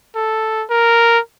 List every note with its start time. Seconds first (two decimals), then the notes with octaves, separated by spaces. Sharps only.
0.15 A4
0.70 A#4